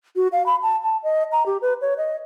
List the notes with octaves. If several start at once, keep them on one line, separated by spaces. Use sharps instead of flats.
F#4
F5
B5
A5
A5
D#5
A#5
G4
B4
C#5
D#5